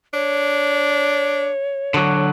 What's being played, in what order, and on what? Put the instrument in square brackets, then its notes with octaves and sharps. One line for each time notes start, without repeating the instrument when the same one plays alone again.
[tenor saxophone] D4 [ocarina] C#5
[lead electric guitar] D3 F#3